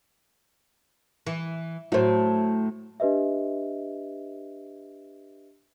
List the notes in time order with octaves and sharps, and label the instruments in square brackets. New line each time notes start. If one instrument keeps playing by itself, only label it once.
[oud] E3
[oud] A2 A3 [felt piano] F#3 C5
[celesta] D4 G4 B4 D#5 E5